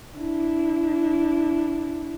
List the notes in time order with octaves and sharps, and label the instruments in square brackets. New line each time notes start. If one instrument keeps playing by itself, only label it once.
[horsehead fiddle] D4 E4